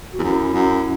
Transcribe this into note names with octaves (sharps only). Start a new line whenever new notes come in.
F#4
E2
F#2 E4
F#2